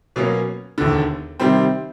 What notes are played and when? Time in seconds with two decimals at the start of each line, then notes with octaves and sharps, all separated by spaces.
0.16 B2 F#3 A#3 C#4
0.78 E1 D#2 D3
1.40 C3 D#3 G3 C4